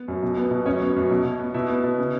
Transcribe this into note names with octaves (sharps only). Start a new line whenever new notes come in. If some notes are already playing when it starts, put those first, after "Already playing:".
Already playing: B3
F#2
B2
B3
B2
F#2 C#4 C#5
B3
F#2
B2
B2
B3
B2 E4 E5
B3
B2
C#3